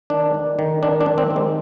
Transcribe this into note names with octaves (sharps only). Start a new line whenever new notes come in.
D#3 D4
D#3
D#3
D#3 D4
D4
D#3
C4
D#3
G#3